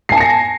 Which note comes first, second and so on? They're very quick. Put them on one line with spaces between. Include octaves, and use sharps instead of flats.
C7 G#5 A5 C#7 A#6